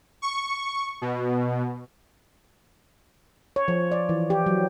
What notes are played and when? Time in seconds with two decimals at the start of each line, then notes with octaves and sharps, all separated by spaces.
0.22 C#6
1.02 B2
3.56 C#5
3.68 F3
3.92 D5
4.09 E3
4.30 G4
4.46 F#3